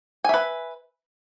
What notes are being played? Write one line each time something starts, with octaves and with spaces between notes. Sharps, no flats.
B4 E5 G#5